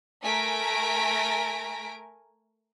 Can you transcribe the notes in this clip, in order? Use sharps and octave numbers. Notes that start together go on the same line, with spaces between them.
A3 A#4 G#5 A#6 B6 D7